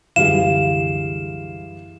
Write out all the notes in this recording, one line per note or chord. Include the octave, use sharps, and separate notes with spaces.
C2 F#2 D3 E3 G3 G#4 F5 E7